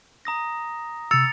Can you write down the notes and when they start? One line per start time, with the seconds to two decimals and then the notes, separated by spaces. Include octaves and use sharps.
0.25 A#5 D#6 A#6
1.11 C3 E6 A6 C#7 F7